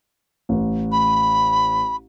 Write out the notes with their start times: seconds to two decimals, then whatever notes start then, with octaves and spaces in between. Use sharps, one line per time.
0.49 A1
0.92 B5